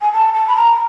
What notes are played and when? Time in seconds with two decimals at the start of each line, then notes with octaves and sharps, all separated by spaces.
0.02 G#5
0.12 A5
0.34 A5
0.47 B5
0.56 A#5